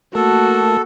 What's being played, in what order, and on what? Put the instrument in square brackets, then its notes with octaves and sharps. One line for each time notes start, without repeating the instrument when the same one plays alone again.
[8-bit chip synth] A3 A#4 A5 [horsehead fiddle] A#3 F#4 [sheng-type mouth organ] A4